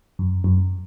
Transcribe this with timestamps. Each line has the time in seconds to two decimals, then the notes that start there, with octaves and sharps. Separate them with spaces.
0.19 F#2
0.44 F#2